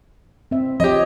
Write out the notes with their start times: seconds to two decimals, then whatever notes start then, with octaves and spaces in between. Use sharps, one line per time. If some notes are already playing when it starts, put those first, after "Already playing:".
0.51 C4 E5
0.80 F3 G4 C#5 D#5